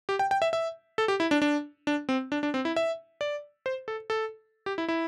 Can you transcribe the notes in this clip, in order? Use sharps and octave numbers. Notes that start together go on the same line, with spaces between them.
G4
G5
G5
E5
E5
A4
G4
E4
D4
D4
D4
C4
D4
D4
C4
E4
E5
D5
C5
A4
A4
G4
E4
E4